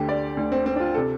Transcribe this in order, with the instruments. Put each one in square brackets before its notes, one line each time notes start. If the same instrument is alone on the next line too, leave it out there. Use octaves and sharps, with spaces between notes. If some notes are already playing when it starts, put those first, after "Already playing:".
Already playing: [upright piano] D2 D3 G4
D5
D2 D3
C4
C4
D4
F4
C3 A4